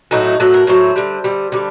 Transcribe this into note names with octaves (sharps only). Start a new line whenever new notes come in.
A2 F#3 A3 D#4
A2 F#3 A3 A4
A#4
A2 F#3 A3 C5
D3 G3
D3 G3
D3 G3